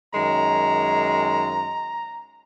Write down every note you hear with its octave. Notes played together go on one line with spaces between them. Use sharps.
F#2 D#3 G#3 A#5